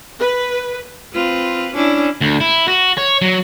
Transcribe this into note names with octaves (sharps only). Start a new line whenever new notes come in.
B4
C4 F4 B4
C#4 D4 E4
D2
E4
F#4
C#5
F#3